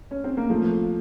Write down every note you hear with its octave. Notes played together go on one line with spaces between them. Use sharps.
C#4
C4
A#3
F3 A3